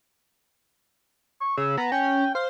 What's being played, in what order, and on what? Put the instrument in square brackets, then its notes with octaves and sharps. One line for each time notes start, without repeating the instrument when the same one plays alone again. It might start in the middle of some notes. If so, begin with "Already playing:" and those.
[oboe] C#6
[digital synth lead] C#3 [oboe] E6
[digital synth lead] B3 [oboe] A#5
[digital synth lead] C#4 [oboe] G5
[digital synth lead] C5 [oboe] F5